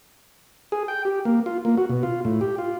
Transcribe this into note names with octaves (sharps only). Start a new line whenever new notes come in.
G#4
G5
G4
A#3
F4
A#3
F#4
B2
F4
A2
G4
F4